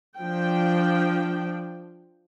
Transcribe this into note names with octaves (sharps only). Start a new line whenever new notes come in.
F3 D4 G5